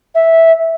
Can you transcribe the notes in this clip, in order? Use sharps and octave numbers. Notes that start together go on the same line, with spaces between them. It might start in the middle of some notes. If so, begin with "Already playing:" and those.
E5